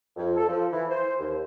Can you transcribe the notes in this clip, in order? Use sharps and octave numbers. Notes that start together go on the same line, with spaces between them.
F2
A4
F3
E3
C5
D#2